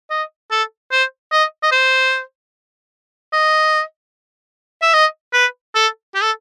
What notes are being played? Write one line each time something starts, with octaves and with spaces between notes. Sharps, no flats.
D#5
A4
C5
D#5
D#5
C5
D#5
E5
D#5
B4
A4
G4
A4